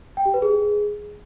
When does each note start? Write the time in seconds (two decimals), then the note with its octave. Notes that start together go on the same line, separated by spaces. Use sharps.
0.17 G5
0.25 G4
0.34 B4
0.42 G#4